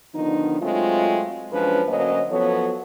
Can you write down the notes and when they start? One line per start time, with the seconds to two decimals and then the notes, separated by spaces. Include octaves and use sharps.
0.14 D3 D#3 F3 B3 D4 D#4
0.60 F#3 G#3 A3 C4 F4
1.51 F#2 F3 G#3 C#4 D4 B4
1.87 D2 F#3 A#3 C#4 C5 D#5
2.30 F3 F#3 B3 A4 C#5